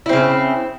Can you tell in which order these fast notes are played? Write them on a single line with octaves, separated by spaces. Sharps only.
E4 C4 C#3